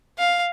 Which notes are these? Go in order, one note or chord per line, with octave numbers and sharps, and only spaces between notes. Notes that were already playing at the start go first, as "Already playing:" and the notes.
F5